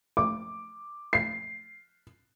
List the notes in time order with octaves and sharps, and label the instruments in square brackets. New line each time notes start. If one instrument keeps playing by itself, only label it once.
[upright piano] D6
C7